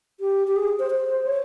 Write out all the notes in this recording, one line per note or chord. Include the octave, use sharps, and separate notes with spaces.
G4
G4
G#4
C5
C5
C#5